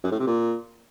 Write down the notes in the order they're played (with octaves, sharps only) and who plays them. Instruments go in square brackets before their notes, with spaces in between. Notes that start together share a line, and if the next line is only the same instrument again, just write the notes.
[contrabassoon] F#2
A2
C3
A#2